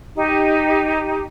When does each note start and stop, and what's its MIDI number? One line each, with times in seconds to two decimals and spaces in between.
0.15 1.24 63
0.15 1.24 67